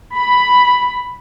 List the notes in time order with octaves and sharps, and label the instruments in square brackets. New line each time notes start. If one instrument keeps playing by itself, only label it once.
[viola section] B5